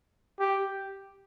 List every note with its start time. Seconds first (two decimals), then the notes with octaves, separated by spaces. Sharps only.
0.40 G4